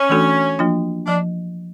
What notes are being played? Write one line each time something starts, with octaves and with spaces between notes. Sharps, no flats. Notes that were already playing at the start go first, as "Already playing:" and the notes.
Already playing: C#4
E3 A3 D4 F#4 A4
F3 A#3 D4 F4
F3 D4